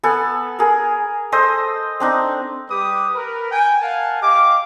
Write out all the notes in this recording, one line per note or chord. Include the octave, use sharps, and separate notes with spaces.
B3 A4 G#5
G#4 A#4
A4 C5 D#5 E6
C4 D4 D#4
G3 G4 B4 D6 D#6
A#4 B4
G5 G#5
A#4 F5 F#5 G#5 A5
G4 D#5 F5 D6